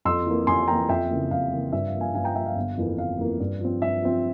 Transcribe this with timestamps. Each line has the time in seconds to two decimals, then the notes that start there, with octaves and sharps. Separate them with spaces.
0.05 F2 C6 E6
0.27 E3 A#3
0.47 F2 G#5 C6
0.68 E3 A#3 G5 A#5
0.89 F2 E5 G5
1.10 C#3 E3 A#3
1.31 F2 F5
1.52 C#3 E3 A#3
1.73 G2 E5
1.87 F5
1.93 F3 A#3
2.01 F5 G#5
2.14 G2 F5 G#5
2.24 G5 A#5
2.35 F3 A#3 E5 G5
2.46 F5
2.56 G1
2.77 F2 E3 A#3
2.98 G1 F5
3.19 F2 E3 A#3
3.40 G2
3.60 F3 C4
3.81 G2 E5
4.02 F3 C4